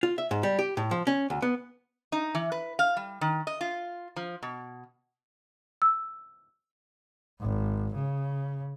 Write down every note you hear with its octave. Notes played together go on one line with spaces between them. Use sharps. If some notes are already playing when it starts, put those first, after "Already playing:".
F4
E5
G#2
G3
G4
A2
F3
C#4
D2
B3
D#4
E3
B4
F5
G3
D#3
D#5
F4
F3
B2
E6
G#1
C#3